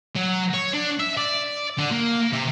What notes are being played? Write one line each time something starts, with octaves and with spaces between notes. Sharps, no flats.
F#3
C#5
D4
E5
D5
D3
A#3
C3